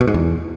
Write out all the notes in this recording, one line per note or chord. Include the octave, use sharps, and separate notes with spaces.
B2
G#2
E2